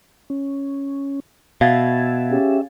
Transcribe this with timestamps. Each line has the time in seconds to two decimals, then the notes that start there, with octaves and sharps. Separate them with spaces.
0.30 C#4
1.61 B2 E5 F5 G#6 A6
2.31 C#4 G4 G#4